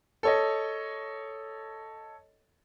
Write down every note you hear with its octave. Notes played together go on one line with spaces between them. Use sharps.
A4 C#5 D#5